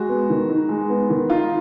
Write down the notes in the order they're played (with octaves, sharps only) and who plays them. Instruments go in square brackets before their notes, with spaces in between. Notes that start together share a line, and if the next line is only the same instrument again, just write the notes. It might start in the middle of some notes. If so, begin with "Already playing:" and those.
Already playing: [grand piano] G#3 [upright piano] F#4
[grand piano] B3
D#3
D#4
G#3
B3
D#3
[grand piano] D#4 [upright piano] F4